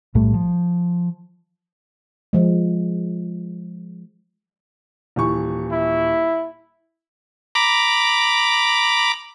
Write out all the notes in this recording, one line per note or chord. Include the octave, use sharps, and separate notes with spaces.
B1 A2 G3 A3
F3
F3 G#3
D#1 E3 C#6
E4
A#5 B5 D6